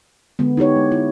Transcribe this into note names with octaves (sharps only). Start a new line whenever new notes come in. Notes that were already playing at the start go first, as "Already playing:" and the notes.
D3 G#3 B3
D#4 E4 G4 C#5
G#3
E4